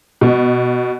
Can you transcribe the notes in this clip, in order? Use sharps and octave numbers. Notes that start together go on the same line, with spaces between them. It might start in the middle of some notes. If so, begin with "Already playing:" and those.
B2